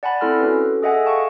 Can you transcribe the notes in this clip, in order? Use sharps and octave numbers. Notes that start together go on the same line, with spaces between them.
D5 F#5 G#5 A5 B5
C4 E4 A4 C6 F6
C#4 F#4 A4 B4
G#4 A4 D#5 E5 F#5 G#5
F5 G5 A5 C#6